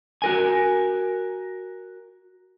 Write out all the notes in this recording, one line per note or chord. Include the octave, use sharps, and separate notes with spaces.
F#4 A#4 G#5